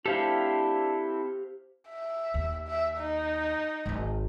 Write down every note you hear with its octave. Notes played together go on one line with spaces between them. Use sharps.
C4 D4 E4 G4 A4 C5 F5
E5
D#2
E5
D#4
G#1 F#3